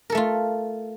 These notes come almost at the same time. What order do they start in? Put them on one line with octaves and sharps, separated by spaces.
A#4 A4 A3 F4